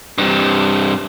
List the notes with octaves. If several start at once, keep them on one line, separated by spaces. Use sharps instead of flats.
G2 C3